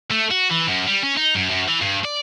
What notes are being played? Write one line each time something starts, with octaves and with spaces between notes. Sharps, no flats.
A3
F#4
E3
F#2
G3
C#4
D#4
F#2
F#2
E3
G2
D5